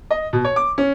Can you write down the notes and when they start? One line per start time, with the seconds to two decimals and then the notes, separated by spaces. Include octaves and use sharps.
0.11 D#5
0.33 B2
0.45 C#5
0.56 D6
0.78 C#4